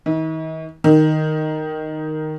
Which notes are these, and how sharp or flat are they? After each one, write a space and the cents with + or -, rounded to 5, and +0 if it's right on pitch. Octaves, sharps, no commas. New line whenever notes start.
D#3 +40
D#3 -5